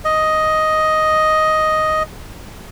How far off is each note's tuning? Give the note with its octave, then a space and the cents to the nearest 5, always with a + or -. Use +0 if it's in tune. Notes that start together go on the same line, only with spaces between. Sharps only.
D#5 +5